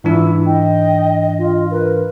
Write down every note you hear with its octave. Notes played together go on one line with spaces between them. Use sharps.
G#2 E3 D4 E4 F4
D#5 G5
F4
A#4 B4